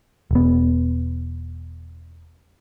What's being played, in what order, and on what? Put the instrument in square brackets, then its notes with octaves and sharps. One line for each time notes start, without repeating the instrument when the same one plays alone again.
[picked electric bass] E1 B3